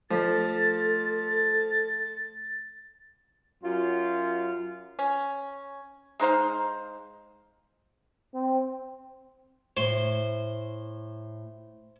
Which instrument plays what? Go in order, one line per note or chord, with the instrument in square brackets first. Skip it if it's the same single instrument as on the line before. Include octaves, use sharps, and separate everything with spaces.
[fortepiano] F3 [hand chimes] A3 [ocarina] A4 [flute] A6
[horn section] F#2 F#3 F4
[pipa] C#4
G#3 D#4 C5 F5
[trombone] C4
[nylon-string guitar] A2 [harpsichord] C5 C6